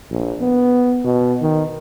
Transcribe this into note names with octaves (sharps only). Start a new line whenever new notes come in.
A#1
B3
B2
D#3